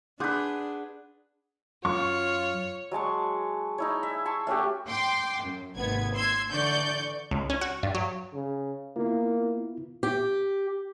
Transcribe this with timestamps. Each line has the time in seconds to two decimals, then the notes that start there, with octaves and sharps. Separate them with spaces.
0.20 D4 G#4 B4 F#5 C6 D6 G6
1.85 F#2 F4 C#5 C#6
2.91 F#3 G#3 A5 C#6
3.78 D#4 E4 C#5
4.03 E5
4.25 A5 C6 C#6
4.47 A3 C#4 F#4 G4
4.88 G5 C6 D6
5.44 F#2
5.76 G#1 D#2 C3 B3 G#6
6.14 C6 E6 G#6
6.51 D3 E3 D5 C#6 G6
7.31 C#2
7.50 C#4
7.61 F#4
7.83 G2
7.95 F#3
8.34 C#3
8.96 A#3 B3 E4 F4
10.03 G4